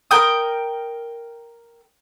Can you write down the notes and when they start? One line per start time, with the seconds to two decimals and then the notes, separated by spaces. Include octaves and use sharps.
0.11 A#4 G5 D#6